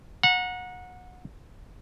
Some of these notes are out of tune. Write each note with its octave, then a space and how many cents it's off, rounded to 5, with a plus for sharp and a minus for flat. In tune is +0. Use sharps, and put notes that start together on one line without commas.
F#5 -25 A#5 +15